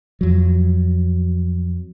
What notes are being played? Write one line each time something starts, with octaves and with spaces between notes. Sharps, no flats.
F2 F#3